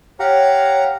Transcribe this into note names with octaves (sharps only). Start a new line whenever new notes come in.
G4 C#5 F5 F#5 A#5